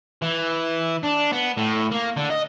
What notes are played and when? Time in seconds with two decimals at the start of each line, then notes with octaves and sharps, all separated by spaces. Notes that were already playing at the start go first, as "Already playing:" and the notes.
0.22 E3
1.03 D4
1.32 B3
1.57 A2
1.92 A#3
2.17 D3
2.30 D#5